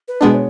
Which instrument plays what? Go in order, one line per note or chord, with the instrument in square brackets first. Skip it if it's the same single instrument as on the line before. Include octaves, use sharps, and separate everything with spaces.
[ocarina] B4
[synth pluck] B2 G#3 B3 D4
[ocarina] C#5